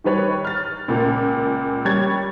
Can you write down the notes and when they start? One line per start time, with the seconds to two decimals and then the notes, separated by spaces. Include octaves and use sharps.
0.04 D#3 G3 B4 C#5
0.45 F6 A6
0.88 C#2 A#2 A#3
1.85 G3 C#5 G#6 A6